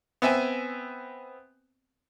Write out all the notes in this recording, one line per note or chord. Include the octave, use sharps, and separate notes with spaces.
B3 C4 E5 G#5